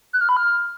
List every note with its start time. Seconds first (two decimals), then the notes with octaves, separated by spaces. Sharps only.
0.13 F#6
0.21 F6
0.29 B5
0.37 F6